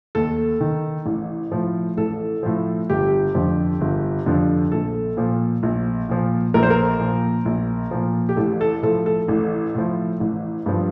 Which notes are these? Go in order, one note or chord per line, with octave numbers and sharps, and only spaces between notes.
D#2 A4
D#3
A1
A2 F3
A1 A4
A2 F3
G1 G4
F2 D3 F3
G1
F2 D3 F3
A#1 A4
A#2 F3
A#1
A#2 F3
A#1 A#4
C5
A#4
A#2 F3
A#1
A#2 F3
G4
A1 A4
A4
A2 F3 A4
A4
A1
A2 F3
A1
G2 F3